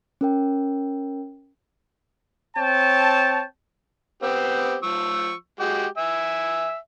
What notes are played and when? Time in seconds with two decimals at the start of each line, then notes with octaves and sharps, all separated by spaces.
0.21 C#4 A#4 G5
2.55 C4 C#5 G5 A5
4.23 B3 C4 G4
4.83 F3 C#6 E6
5.60 G#3 F#4 G4
5.97 E5 G#5